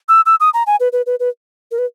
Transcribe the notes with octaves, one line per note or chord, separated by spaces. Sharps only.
E6
E6
D#6
A#5
G#5
B4
B4
B4
B4
A#4
B4